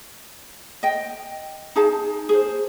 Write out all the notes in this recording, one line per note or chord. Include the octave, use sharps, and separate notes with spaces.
D#5 G5
D#4 G#4 A5
G#4 C5